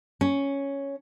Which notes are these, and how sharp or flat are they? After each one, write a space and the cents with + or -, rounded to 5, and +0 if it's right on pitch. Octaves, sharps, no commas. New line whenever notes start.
C#4 +0